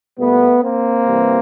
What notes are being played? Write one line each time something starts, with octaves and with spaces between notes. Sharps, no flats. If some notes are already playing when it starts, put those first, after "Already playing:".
A#2 G3 A3 B3
A#3 C4
C3 E3 G3